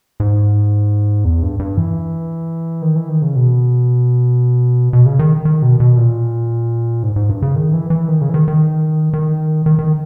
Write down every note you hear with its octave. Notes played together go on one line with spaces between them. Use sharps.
G#2
E2
G2
G2
E3
D#3
E3
D#3
C#3
B2
B2
C#3
D#3
D#3
B2
B2
A#2
G#2
G#2
G2
C#3
D#3
E3
E3
D#3
C#3
E3
D#3
D#3
D#3
D#3
D#3